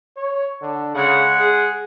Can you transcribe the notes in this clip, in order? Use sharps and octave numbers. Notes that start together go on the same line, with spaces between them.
C#5
D3
C#3 G#3 F#5
G#4